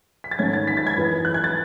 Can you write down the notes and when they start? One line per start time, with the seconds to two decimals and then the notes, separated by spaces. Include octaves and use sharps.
0.24 B6
0.31 A6
0.39 G#2 D#3 A3 C#4 G#6
0.53 A6
0.67 B6
0.77 A6
0.87 G#6
0.96 F#2 E3 B3
1.25 F#6
1.34 G#6
1.44 A6